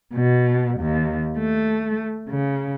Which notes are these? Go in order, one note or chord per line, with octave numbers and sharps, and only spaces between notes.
B2
D#2
A3
C#3